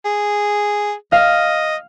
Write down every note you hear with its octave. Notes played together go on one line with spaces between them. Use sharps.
G#4
D#5 F5